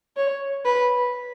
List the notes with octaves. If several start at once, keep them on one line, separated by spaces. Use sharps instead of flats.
C#5
B4